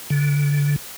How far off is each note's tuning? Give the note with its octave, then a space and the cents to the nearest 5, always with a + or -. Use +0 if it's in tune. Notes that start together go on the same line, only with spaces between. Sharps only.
D3 -25